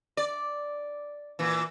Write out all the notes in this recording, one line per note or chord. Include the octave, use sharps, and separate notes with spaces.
D5
A#2 E3